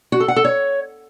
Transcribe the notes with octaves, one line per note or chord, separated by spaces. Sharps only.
F#4
A4
F#5
A4
C#5